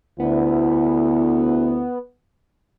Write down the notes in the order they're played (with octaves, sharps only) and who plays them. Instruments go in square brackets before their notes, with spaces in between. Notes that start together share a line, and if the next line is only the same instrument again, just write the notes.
[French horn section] D2 E4 [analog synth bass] B3